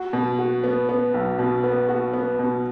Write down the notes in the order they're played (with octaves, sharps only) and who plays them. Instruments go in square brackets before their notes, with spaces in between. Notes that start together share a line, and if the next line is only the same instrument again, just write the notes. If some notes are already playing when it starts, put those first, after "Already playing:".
Already playing: [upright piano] F#4
B2
F#4
B3
B3
B1
B2
B3
F#4
B3
B2